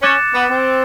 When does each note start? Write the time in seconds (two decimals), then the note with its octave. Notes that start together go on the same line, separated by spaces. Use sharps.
0.02 C#4 D6 F#6 A6 C#7 E7
0.34 B3
0.50 C4